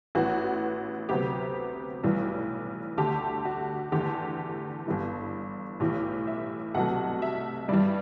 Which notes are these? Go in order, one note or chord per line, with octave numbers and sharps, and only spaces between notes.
A1 A2 E3 B3 F#4
D2 C3 F#3 B3 G4
B1 A2 E3 G3
D2 D3 A3 G4
F#4
E2 D3 A3 G4
G1 G2 E3
B1 A2 E3 G4
E5
C2 B2 F#3 A3 F#5
E5
G2 E3 G3 D5